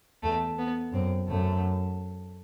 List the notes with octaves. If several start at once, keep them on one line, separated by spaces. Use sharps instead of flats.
E2 A3
B3
F#2 C4
F#2 A3